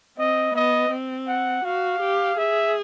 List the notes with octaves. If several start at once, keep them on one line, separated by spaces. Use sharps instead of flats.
C4 D#5
B3 D#5
C4
F#5
F#4 F5
G4
G#4 E5